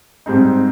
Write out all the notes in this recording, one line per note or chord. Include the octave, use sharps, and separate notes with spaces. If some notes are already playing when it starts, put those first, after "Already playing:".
G#2 G3 C4 D#4